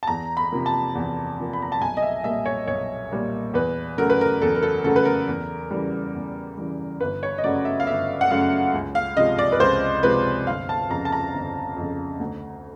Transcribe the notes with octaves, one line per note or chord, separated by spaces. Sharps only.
A5
E2 A#5
B5
C3 F3 A#3
A5
E2
C3 F3 A#3
B5
A#5
A5
B1 G#5
D#5
E5
A#2 G3 A#3 E5
C#5
B1 C#5
A#2 G3 A#3
E2 B4
C#3 F#3 A3 A#4
B4
A#4
E2 A4
A#4
A4
C#3 F#3 A3 A4
B4
A#4
E2
C#3 E3 G3
E2
C#3 E3 G3
G1 B4
C#5
D#5
F#2 C#3 F#3 A3 D5
E5
F5
G1 E5
F#5
F#2 C#3 F#3 A3 F5
C#2
F5
C3 F3 G#3 D#5
D5
B4
C#2 C5
C3 F3 G#3 B4
G1 F5
A5
F2 C#3 A#5
A5
A#5
G1
F2 C#3
D2